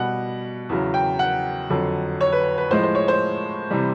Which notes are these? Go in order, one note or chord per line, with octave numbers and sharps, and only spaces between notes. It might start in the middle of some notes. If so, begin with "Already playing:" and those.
Already playing: B2 G3 F#5
E2 C#3 F#3
G5
F#5
F2 D3 F#3
C#5
B4
B4
A2 F3 G#3 C5
C5
C#5
C5
C3 E3 G3